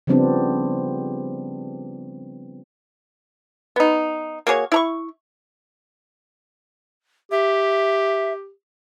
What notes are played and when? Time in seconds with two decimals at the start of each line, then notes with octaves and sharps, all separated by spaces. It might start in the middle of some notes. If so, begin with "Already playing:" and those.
0.07 C#3 F3 G3 B3 C4 D4
3.76 B3 D#4
4.47 A#3 F#4 G#4 C#5
4.72 E4 A#5 C#6
7.32 G4 E5